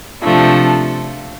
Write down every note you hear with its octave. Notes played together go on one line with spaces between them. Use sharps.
C3 F3 A3 D4